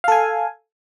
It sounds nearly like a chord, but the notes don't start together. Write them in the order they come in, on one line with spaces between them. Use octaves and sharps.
F5 A4 G#5